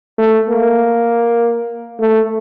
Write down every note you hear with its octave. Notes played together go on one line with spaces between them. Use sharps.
A3
A#3
A3